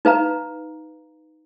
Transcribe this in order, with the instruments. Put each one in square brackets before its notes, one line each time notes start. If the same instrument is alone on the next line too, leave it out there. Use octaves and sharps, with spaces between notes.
[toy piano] D#4 B4 F5 A#5